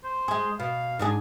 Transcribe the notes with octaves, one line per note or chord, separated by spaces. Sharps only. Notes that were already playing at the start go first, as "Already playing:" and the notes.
C5
G#3 G#4
B2 F5
G#2 D4 G#4